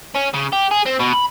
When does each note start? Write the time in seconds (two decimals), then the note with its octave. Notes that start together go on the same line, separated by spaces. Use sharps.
0.16 C#4
0.34 C#3
0.53 G4
0.71 G#4
0.86 C4
0.99 B2
1.13 B5